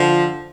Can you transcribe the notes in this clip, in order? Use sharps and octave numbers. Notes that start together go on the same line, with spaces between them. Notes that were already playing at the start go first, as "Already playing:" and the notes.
Already playing: D3 F3